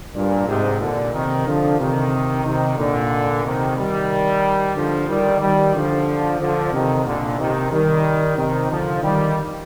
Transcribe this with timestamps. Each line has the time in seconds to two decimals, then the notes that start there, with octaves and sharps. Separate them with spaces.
0.14 G2 A#2
0.47 G#2 C3
0.81 A#2 D3
1.13 C3 D#3
1.47 D3 F3
1.79 C3 D#3
2.45 C3 D#3
2.78 A#2 D3
3.44 C3 D#3
3.77 D#3 G3
4.75 D3 F3
5.08 D#3 G3
5.41 D#3 G3
5.75 D3 F3
6.40 D3 F3
6.72 C3 D#3
7.05 A#2 D3
7.39 C3 D#3
7.71 D#3 G3
8.37 C3 D#3
8.70 D3 F3
9.03 D#3 G3